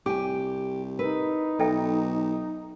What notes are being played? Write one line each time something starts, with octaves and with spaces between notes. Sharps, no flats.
C2 G4 G#5 D6
D#4 A#4 B4
B1 A4 E5 G5